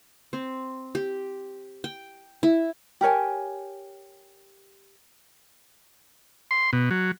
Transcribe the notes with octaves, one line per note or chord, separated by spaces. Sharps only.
C4
G4
G5
E4
G4 A#4 C#5 G#5
C6
B2
F#3